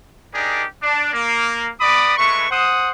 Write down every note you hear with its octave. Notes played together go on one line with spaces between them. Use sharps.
D4 D#4 G4 G#4 A#4 D5
D4
A#3
B3 D5 B5 D6 D#6
G#3 A3 E4 B4 C#6
C5 F#5 D#6